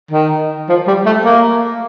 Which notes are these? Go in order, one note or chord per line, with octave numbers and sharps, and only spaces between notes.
D#3
F3
G3
A3
A#3